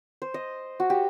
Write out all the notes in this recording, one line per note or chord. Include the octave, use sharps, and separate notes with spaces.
C5
D#5
F#4
G4